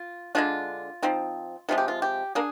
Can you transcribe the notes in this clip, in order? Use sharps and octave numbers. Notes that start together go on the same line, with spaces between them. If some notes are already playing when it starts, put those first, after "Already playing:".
Already playing: F4
D3 G#3 D4 F4
F3 C4 D#4
C3 F3 G#3 F4
G4
F4
G4
A#3 D4 G#4